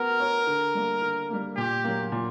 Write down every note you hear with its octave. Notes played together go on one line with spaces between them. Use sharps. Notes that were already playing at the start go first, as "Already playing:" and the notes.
Already playing: B3 F#4 A#4
F#4 C#5
D3
G3 A#3
D3
G3 A#3
A#2 G4
F#3 A#3
A#2